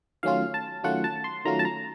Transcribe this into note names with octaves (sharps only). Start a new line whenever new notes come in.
D#3 F#3 A3 C#4 F4 F5
A5
D#3 F#3 A3 C#4 F4 F#5
A5
C6
D#3 F#3 A3 C#4 F4 A#5
A5
A#5